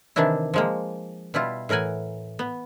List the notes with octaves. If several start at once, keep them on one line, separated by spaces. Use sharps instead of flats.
C3 D#3 E3 D4 E4
F3 G#3 A#3
B2 G3 E4 F4
A2 E3 A#4 F#5 G#5
B3